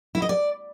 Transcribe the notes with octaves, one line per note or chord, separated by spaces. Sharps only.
E4
D#5
D5